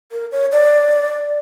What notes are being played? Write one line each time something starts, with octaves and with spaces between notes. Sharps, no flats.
A#4
C#5
D5